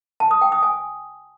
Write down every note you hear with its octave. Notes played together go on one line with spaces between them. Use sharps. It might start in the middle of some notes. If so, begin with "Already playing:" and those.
A5
D#6
G5
D#6
G#5